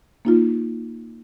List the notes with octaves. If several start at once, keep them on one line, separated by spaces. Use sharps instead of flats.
A#3 D#4 F4